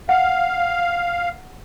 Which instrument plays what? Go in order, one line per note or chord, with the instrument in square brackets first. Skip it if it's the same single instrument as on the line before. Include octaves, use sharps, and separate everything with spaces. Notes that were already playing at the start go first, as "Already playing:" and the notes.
[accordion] F5 [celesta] F#5